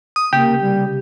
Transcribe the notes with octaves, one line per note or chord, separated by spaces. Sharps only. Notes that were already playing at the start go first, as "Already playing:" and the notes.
D#6
C2 C#3 A#3 G4
G3